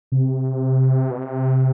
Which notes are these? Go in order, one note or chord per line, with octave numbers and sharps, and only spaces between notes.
C3
B2
C3